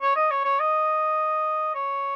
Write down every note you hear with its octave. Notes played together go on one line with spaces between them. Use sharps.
C#5
D#5
C#5
C#5
D#5
C#5